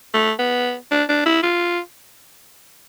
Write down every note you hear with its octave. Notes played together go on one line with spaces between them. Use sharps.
A3
B3
D4
D4
E4
F4